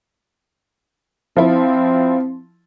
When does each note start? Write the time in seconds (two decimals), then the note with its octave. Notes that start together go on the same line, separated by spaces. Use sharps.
1.37 F3 C4 E4